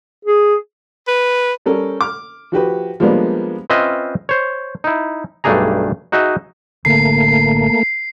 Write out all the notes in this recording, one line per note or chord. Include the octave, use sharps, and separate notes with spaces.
G#4
B4
G3 C#4 A4 A#4
D6 F6
F3 F#4 G4 B4
F3 G3 G#3 A#3 B3 D4
C4 C#4 F4 B4 D#5 E5
C5 C#5
D#4 E4
B1 G2 A3 D4 G#4 A#5
D#4 F#4 G#4 D#5 E5
A1 D3 A3 A#3 C4 C7